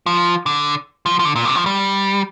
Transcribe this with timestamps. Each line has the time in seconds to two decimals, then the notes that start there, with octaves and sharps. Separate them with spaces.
0.06 F3
0.46 D3
1.06 F3
1.19 F3
1.25 D3
1.36 A#2
1.45 C3
1.55 F3
1.66 G3